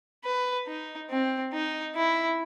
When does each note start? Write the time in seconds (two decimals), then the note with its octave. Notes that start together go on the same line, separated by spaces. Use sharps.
0.24 B4
0.67 D#4
1.10 C4
1.53 D#4
1.96 E4